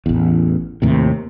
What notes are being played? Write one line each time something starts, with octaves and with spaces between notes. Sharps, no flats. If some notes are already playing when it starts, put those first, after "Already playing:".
A1 E2
D#2 A2 C3